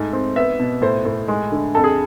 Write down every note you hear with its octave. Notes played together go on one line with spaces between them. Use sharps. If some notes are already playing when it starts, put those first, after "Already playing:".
Already playing: G#2 A3
C4
B3 E5
B2
A2 C5
A2
G#3
D3
F2 A4
G#4